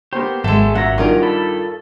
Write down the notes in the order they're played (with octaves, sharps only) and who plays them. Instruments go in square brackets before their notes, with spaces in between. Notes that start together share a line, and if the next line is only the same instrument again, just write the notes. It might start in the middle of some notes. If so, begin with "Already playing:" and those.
[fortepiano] A#3 B3 C5 [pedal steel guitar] G4
[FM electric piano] G#1 [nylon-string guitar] F#3 G#3 [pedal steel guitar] A4 E5
[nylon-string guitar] A#2 [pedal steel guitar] F#3 C#4 A#5 [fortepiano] E5 F#5
[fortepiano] G2 D#3 [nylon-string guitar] F4 A#4 D5
[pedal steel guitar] A4 [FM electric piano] B5